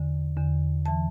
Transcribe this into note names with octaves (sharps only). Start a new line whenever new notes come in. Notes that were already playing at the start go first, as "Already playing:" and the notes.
Already playing: E2 D3
E2 D3
E3 A5